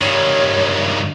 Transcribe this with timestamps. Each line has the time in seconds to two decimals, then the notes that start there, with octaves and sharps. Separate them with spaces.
0.01 G2 D#3 C#5